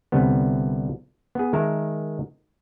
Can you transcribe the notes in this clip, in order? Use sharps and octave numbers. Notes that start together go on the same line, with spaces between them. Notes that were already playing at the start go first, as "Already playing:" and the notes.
C2 D3 G3 B3
B3 G#4
D#3 G#3 A#4 E5 A5